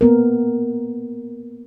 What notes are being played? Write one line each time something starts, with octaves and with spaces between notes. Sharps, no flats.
A#3 B3 A#4